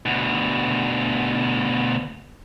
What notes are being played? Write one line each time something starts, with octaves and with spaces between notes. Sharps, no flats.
D2 B2